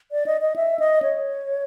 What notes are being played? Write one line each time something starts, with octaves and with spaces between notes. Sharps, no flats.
D5
D#5
D#5
E5
D#5
C#5